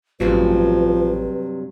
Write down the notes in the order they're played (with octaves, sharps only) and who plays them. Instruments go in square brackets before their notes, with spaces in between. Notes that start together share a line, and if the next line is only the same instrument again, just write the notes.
[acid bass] A1 [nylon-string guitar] G2 C3 F#3 [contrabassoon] F3 [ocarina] B4